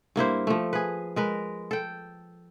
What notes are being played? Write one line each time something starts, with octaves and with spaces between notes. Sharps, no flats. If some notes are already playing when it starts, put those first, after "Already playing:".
G2 A#3 E4 C5
F3 A3
G#4 B4
G#3 A#4 B4
A4 G5